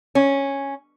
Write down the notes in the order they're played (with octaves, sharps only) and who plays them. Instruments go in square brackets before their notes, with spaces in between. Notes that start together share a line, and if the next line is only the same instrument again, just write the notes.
[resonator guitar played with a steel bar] C#4